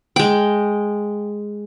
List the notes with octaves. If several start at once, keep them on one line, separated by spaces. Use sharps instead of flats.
G#3 G5